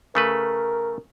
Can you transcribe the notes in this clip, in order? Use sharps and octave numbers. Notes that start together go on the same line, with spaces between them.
C#3 A3 A#4 B4